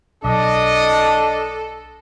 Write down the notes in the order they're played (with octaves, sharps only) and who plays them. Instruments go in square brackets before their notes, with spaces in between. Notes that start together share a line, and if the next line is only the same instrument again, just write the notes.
[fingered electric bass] B1 [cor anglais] D4 [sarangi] A4 [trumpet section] D#5